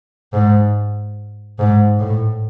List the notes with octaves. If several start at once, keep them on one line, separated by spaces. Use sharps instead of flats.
G#2
G#2
A2